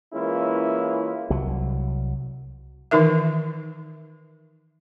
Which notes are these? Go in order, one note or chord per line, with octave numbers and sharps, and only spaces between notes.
E3 G#3 A#3 C#4 E4 F4
C2 F#3
D#3 E3 D#4 A#4 E5